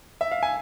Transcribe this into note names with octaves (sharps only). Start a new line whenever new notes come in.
E5
F5
G#5